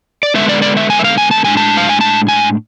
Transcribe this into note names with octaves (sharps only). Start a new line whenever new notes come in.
D5
D3 G#3 B3 D4 E5
D5
D5
E5
G#5
E5
F5
G#5
A5
A2 G#3 D4 G#5
A5
F5
G#5
A5
G#5